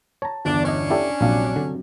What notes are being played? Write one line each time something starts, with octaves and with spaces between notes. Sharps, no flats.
C#5 A5 A#5
G1 E2 D4
C#4 D4 C#5 D#5
E4 G4 A4 D5
A#1 G2 C3 F#3 F5
D3